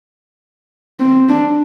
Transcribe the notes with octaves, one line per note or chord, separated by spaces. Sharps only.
C4
D4